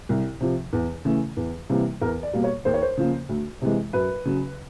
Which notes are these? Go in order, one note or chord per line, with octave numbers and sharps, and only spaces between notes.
C2
C3 F3
E2
C#3 E3 A3
E2
C3 E3 G3 A#3
E2 A#4
D5
B2 G3 A#3
C#5
D#2 C5
C#5
C5
C#3 F3 A#3
D2
C3 E3 G#3
F#2 B4
C#3 F#3